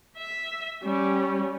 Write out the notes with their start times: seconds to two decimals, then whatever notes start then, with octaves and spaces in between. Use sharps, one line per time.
0.17 E5
0.84 G3 C#4